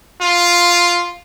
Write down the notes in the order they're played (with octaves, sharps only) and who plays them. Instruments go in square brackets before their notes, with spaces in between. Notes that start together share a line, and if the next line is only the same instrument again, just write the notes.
[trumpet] F4